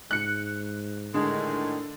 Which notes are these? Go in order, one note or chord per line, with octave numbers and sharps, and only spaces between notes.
G#2 F#6 C#7
A2 D3 D#3 G#3